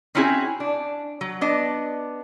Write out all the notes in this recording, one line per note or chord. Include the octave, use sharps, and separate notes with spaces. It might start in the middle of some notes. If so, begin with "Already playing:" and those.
C4 C#4 D#4 E4 F#4 G#4
D4
F#3
B3 D4 D#5